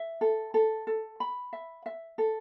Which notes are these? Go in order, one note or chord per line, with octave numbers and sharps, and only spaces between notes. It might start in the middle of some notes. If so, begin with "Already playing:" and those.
Already playing: E5
A4
A4
A4
B5
E5
E5
A4